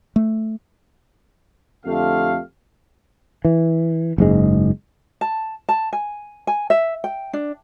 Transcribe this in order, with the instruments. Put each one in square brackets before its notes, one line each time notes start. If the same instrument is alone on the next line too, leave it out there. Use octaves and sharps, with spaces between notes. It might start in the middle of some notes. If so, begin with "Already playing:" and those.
[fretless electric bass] A3
[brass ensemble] F2 D3 A3 G4 F5
[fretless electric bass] E3
F#1 G#2 G#3
[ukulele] A5
A5
G#5
G#5
E5
G5
D4